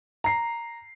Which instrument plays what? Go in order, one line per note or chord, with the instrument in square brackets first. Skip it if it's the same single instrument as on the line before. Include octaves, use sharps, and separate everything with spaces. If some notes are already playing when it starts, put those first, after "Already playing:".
[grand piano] A#5 C7